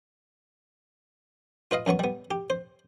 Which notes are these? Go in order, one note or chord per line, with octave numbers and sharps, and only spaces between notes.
F4 B4 D#5 F5
F#2 F#3 B3 C#6
G3 B3
G4
C5